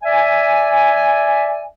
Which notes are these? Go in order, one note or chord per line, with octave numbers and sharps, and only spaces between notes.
D5 E5 G#5